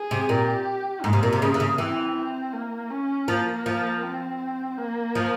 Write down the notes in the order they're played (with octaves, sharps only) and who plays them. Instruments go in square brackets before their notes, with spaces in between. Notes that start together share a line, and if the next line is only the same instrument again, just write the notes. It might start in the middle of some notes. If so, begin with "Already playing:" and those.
Already playing: [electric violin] G#4
[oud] C3
[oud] A#2 [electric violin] G4
[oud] G#2 [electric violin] A#3
[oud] C3
A#2
C3
C#3
E3
C#3
[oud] E3 [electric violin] C4
[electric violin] C4
A#3
C#4
[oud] F3 [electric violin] A#3
[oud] F3
[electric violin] C4
A#3
[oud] F3